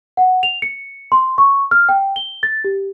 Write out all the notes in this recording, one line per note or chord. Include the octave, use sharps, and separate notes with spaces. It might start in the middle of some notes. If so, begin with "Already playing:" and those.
F#5
F7
C#7
C6
C#6
F6
G5
G7
A6
G4